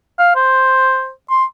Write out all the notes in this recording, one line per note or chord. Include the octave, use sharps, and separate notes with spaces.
F5
C5
C6